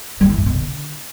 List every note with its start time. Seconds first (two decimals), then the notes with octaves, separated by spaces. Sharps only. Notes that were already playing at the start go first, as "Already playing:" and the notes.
0.21 G3
0.29 E3
0.38 A2
0.46 B2
0.54 D3